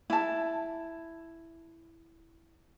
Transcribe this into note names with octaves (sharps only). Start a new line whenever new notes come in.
E4 A5